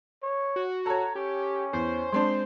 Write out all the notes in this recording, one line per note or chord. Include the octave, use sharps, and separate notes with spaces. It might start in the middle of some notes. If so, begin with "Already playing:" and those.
C#5
F#4
A4 C#5 A#5
C#4 G4
E2 C5
G#3 C4 D4 C6